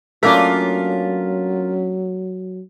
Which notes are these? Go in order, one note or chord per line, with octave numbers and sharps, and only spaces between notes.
F#3 A3 A#3 C#4 D4 F4 A#4 B6